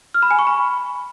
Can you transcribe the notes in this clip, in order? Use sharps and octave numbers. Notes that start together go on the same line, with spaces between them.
F6
B5
G#5
C#6
B5